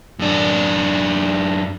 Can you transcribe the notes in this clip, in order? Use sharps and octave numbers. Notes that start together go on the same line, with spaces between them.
F#2 D4